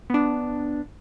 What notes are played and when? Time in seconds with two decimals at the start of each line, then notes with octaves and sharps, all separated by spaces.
0.10 B3 D4